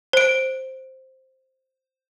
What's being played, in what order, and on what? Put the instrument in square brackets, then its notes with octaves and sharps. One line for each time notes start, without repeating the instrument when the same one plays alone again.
[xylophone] C5 D7